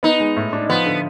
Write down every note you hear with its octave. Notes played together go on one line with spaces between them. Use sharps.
B3 D#4
G#3
A2
D4
F3 B3
D3